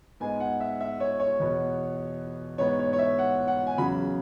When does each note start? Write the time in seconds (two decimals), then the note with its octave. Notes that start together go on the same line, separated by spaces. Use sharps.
0.20 G#2 G#3 B3 G#5
0.40 F#5
0.60 E5
0.80 E5
1.00 C#5
1.20 C#5
1.39 E2 B2 B3
2.58 G#2 E3 B3 C#5
2.79 C#5
2.93 C#5
2.99 E5
3.18 F#5
3.48 F#5
3.67 G#5
3.77 E2 C#3 F#3 B5